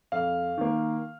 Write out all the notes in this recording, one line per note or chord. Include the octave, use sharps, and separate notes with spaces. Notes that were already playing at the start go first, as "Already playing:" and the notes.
F2 F5
D#3 A#3